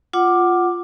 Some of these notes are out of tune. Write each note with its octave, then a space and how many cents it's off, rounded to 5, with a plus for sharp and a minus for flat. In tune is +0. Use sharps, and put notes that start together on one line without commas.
F4 +0 F#5 +10 D6 +10